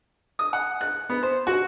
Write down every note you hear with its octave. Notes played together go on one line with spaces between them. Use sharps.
D#6
F#5
F#6
B3
C5
F#4